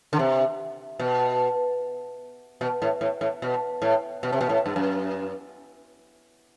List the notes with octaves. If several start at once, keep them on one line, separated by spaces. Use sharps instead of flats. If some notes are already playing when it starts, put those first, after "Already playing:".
D3
C3
B2
B2
A2
A2
A2
B2
A2
B2
C3
B2
A2
G2
F#2